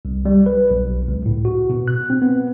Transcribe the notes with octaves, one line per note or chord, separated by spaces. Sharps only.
C2
G3
B4
B1
C#2
A2
F#4
B2
F#6
C4
B3